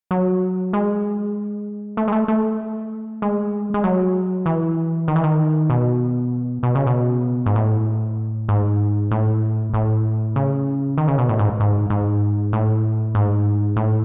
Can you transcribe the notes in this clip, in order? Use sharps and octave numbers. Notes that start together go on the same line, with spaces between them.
F#3
G#3
A3
G#3
A3
A3
G#3
G#3
F#3
E3
D#3
E3
D#3
B2
B2
C#3
B2
G#2
A2
G#2
A2
A2
C#3
D#3
C#3
B2
A2
G#2
G#2
G#2
A2
G#2
A2